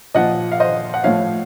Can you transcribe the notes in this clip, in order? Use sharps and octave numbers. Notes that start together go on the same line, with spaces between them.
A#2 F3 D#5 F#5
F5
C5 D#5
F#5
A2 F3 C#5 F5